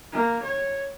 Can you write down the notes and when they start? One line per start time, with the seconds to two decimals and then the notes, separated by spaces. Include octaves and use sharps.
0.12 A#3
0.43 C#5